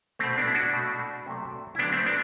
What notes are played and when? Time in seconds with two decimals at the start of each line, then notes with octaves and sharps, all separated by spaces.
0.19 B2 A3 C4
0.38 B3 D4
0.47 E4
0.55 D4 F#4
0.73 B2 A3
1.26 C3 F#3 A3
1.75 E4
1.79 D3 F#3 A3 B3 D4
1.92 A3 C4
2.06 B3 D4